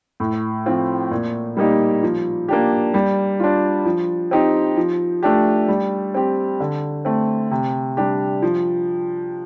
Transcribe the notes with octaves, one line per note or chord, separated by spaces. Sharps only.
A2
F3 C4 F4
A#2
G3 A#3 D#4 G4
F3
A#3 D4 G4
G3
D4 F4
F3
C4 D#4 G4
F3
A3 D4 G4
G3
C4 G4
D3
A3 C4
C3
G3 D4 G4
F3